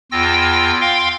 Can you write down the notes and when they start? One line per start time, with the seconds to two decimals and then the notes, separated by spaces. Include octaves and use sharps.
0.12 E2 F4 G5 E6 A#6
0.81 F5 G5 C6